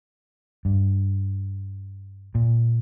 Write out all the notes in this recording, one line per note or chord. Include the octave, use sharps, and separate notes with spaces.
G2
A#2